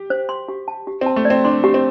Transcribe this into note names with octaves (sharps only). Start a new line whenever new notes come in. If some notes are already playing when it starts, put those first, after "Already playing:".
Already playing: G4
C5
C6
G4
A5
G4
C4
A5
A3
D5
C4
D4 C6
G4
C4